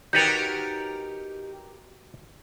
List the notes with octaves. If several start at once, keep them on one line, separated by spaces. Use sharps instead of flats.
D#4 F#4 G4 A#4 B4 C#5 G6 A6